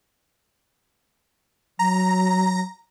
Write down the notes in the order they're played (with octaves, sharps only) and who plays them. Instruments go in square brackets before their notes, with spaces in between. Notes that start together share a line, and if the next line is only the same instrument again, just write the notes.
[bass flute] F#3 [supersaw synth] A#5